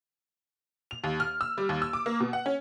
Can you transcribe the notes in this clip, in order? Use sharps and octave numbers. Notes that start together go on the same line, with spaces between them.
F7
D#2
F6
E6
G3
D#2
E6
D6
A#3
B2
F#5
C#4